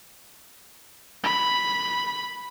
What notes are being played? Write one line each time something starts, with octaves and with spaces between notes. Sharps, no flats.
B5